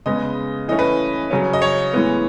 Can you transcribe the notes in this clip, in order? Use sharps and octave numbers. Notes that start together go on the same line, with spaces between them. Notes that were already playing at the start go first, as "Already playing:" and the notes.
C#3 G#3 B3 D#5
E3 A3 C#4 D#5
B4
C#3 F#3 C#4
D#5
C#5
A2 E3 G#3 B3